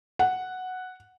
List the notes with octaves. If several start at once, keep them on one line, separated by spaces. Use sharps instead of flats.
F#5